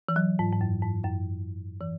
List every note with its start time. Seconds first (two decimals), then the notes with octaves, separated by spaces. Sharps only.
0.09 E3
0.16 F#3
0.39 G#2
0.52 G#2
0.61 F#2
0.82 G#2
1.04 F#2
1.81 E3